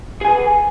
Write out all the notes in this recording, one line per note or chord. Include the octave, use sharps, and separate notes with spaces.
G#4 B4 G#5